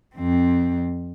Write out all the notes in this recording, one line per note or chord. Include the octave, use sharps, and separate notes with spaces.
F2 C4